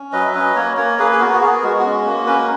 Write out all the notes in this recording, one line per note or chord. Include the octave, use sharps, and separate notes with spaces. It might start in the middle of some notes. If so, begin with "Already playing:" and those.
Already playing: C#4
F#3 B4 D#5
E5
C#4 B4 D#5
A#3 A#4 C#5
A#3 A#4 C#5
A#3 G#4 B4
G#4
B3 F#4 A#4
F#4
B3 G#4
G#3 F#4
F#4
C#4
A#3
C#4 B4
A#4